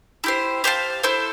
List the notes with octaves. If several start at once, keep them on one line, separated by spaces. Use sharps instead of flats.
E4 G4 C5
G4 C5 F5 A5
E4 A4 C5